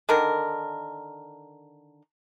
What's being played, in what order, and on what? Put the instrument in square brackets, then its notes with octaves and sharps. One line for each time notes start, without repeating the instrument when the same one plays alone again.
[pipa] D3 D#3 A#4